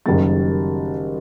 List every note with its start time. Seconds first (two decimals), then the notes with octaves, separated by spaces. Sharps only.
0.06 F#1 F#2 D#3 G3 A6